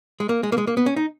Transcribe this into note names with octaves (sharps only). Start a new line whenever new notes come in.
G#3
A#3
G#3
A#3
G#3
A#3
B3
C#4
D#4